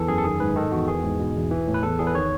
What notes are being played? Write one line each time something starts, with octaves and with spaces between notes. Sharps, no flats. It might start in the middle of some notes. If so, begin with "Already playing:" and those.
Already playing: E2 E3 A4
F#2 G#4
A4
D#3 G#4
G#2 B4
D#3 A4
E2 F#4
E3 G#4
G#2
B2
E2
E3
A2
B4
E2 A4
E2 G#4
B4
D#3 C#5